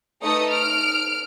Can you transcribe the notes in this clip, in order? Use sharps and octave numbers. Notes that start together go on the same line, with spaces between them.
A3 D#4 A4 B4 D#6 C#7
F6 D7